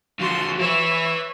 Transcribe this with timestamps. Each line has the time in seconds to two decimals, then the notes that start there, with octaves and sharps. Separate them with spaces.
0.19 D3 F3 F#4 C6
0.60 E4 B4 C#5 E5